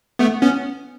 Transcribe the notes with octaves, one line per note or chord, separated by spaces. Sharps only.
A3 B3
B3 C#4